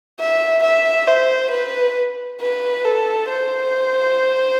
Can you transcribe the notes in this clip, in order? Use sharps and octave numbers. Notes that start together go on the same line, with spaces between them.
E5
E5
C5
B4
B4
A4
C5